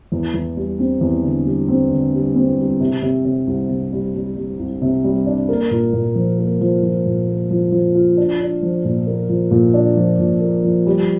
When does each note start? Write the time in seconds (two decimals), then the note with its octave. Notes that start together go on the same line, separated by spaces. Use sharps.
0.12 E2
0.34 E2
0.57 G3
0.79 C4
1.01 E2
1.24 D3
1.46 G3
1.68 C4
1.91 D3
2.13 G3
2.36 C4
2.58 G3
2.81 C3
3.02 C3
3.25 C3
3.47 C2
3.70 C3
3.92 G3
4.14 G3
4.37 G3
4.59 C2
4.82 C3
5.04 G3
5.26 D4
5.49 A#3
5.71 A#2
5.93 A#2
6.15 F3
6.38 A#3
6.61 F3
6.83 F3
7.06 A#2
7.27 A#3
7.51 F3
7.72 F3
7.95 F4
8.17 D4
8.40 D4
8.62 F3
8.85 A#2
9.07 A#3
9.29 F3
9.51 A#2
9.74 D4
9.96 F3
10.19 A#2
10.41 A#3
10.64 F3
10.86 G3